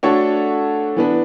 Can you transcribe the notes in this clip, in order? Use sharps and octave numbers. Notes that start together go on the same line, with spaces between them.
A3 D4 F#4 A4 C#5
E3 B3 D4